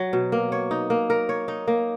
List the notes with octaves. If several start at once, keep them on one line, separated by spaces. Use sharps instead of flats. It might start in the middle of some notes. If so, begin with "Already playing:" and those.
Already playing: F#3
B2
A#3
C#5
D#4
A#3
A#4
C#5
D#4
A#3